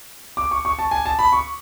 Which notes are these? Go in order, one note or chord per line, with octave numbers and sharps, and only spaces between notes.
D6
C#6
C#6
A5
G#5
A5
B5
C#6